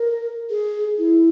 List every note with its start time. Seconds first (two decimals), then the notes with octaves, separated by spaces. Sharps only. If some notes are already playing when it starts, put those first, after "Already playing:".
Already playing: A#4
0.50 G#4
0.98 E4